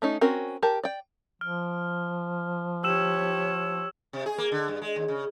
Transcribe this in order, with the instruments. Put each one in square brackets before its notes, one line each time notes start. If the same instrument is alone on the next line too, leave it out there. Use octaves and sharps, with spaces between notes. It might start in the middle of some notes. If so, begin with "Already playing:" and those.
[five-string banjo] A3 C#4 D#4
C4 C#4 F#4 A#4
G4 A#4 A5
D5 G5
[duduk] F3 [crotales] F6
[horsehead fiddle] G4 C#5 [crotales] E6 E7
[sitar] C3
G#4
A#3
D3
G2
G#3
D#2
C#3